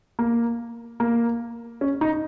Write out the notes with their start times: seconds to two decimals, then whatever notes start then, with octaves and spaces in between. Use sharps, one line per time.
0.19 A#3
1.00 A#3
1.81 C#4
2.01 D#4